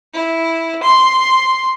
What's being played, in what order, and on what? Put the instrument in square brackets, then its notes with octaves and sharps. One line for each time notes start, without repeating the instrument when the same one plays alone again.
[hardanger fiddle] E4
C6